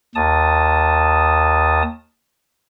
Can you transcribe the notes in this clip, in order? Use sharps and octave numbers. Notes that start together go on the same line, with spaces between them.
D#2 A5 D#6